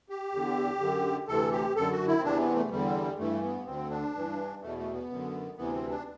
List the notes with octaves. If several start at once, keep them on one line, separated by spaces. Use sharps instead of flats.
G4
E2 D3
F#2 D3
D2 C3 E3 A4
G4
F#2 D3 A4
F#4
E4
C4
E2 C3 E3 D4
B3
A3
E2 D3 G3
G2 E3 A3
B3
D2 D3 C4
D4
G2 E3
E2 B2 A3
A3
B3
F#2 D3
D2 C3 E3 B3
C4
D4